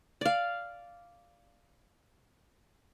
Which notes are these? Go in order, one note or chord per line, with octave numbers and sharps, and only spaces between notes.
D5 F5